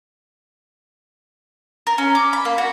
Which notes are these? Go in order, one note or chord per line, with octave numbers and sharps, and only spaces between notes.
A#4
C#4
D6
B5
A#3
F#4